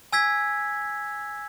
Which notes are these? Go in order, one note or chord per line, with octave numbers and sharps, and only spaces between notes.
G#5 E6 G#6 B6